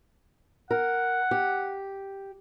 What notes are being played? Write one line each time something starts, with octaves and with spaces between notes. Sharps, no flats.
A#4 F#5
G4